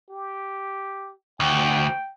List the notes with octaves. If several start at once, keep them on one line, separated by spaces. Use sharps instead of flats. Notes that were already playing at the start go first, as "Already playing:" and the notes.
G4
D2 G5